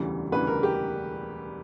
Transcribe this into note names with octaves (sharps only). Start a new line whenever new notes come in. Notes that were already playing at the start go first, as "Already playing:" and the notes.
Already playing: E1 D2 C#3 E3 G3
E1 D2 C#3 E3 G3 B4
A#4
G4